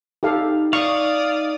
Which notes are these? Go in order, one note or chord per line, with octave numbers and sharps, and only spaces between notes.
D#4 G4 A4 F5
D5 F5 C#6 D#6